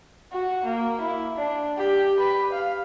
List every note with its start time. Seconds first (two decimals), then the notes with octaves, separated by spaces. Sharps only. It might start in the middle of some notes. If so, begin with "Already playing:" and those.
0.32 F#4
0.64 A#3
1.01 E4
1.37 D4
1.77 G4
2.19 B4
2.52 F5